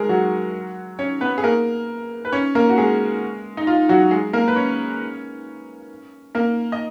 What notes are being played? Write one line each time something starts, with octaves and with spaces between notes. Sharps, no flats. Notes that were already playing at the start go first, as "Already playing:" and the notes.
Already playing: G#3 G#4 A#4
F#3 F#4
C#4 C#5
B3 B4
G#4
A#3 A#4
B4
C#4 C#5
A#3 A#4
F#4
G#3 G#4
D#4
F4
F#3 F#4
G#3 G#4
A#3 A#4
B4
C#4 C#5
A#3 A#4
D#5